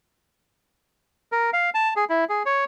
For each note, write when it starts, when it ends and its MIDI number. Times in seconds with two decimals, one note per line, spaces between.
1.32 1.50 70
1.53 1.70 77
1.75 1.93 81
1.96 2.05 68
2.10 2.24 64
2.29 2.43 68
2.46 2.64 73